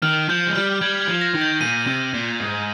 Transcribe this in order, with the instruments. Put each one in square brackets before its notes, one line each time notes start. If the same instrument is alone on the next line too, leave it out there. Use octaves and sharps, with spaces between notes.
[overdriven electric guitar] D#3 [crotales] F6
[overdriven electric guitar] F3 [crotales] G6
[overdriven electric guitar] G#3
[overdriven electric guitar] G3 [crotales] F6
[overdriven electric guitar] G3 [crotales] G#6
[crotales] G#6
[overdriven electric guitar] F3
[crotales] A#6
[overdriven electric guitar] D#3
[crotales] G6
[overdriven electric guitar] A#2 [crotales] D#7
[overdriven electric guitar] C3
A#2
G#2